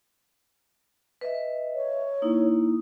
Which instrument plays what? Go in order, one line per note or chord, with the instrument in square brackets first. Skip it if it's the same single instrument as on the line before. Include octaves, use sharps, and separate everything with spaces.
[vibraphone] B4 D#5 E5
[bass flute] C#5
[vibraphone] A#3 D#4 E4